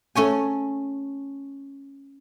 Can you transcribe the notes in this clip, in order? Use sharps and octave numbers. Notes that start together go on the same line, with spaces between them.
A3 C#4 C#5 G#5